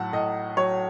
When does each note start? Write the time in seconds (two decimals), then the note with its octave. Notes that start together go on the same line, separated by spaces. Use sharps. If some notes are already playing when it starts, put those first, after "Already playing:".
Already playing: A2 F#3 F#5 A5
0.13 A2 D#5
0.57 F#3 C#5